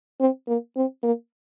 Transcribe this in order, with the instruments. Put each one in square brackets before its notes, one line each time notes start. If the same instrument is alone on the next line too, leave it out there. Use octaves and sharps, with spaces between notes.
[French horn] C4
A#3
C4
A#3